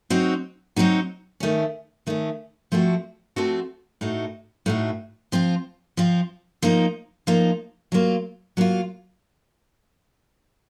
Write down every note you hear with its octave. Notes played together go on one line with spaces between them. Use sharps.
F#3 C4 D#4 F#4
F#3 C4 D#4 F#4
D#3 A3 C#4
D#3 A3 C#4
F3 A3 C4 F#4
F3 A3 C4 F#4
A2 A3 D#4 F#4
A2 A3 D#4 F#4
F3 C4 F4
F3 C4 F4
F3 A#3 D#4
F3 A#3 D#4
F#3 A#3 F4
F#3 A#3 F4